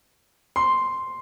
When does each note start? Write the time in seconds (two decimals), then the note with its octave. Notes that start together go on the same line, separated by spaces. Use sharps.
0.56 C6